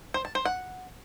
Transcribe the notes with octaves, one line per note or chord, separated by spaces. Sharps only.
C5
A5
C5
F#5